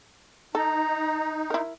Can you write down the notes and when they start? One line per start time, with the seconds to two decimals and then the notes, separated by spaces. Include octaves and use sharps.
0.55 D#4 A4 A#5
1.50 E4 A#4